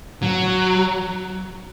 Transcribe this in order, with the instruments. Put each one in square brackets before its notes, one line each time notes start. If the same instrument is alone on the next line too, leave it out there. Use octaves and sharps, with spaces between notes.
[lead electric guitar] F#3